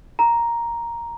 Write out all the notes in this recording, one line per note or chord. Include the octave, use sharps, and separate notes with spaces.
A#5